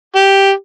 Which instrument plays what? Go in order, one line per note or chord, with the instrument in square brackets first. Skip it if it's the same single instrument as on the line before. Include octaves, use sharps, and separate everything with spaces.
[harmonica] G4